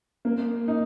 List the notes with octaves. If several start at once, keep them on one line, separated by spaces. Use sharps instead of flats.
A#3
D#4